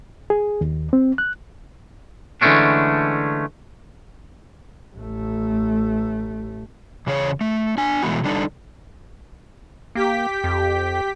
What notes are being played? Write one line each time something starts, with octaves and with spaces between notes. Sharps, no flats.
G#4
D#2
C4
F#6
D3 E3 G#3 A3 C#4 D4
A1 A3
E2 C#3 G#4 C#5
A3
D4 G#5
B2 E3 G#3 A3 B3 F#4
D3 G3 D4 D#4 A4
A#3 G4 G5 B6
F2